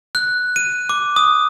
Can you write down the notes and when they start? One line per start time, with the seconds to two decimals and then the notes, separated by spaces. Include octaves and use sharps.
0.15 F#6
0.56 D#7
0.89 D6
1.16 D#6